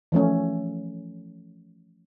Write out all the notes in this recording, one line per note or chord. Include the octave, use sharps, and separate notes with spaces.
E3 F3 A3 C#4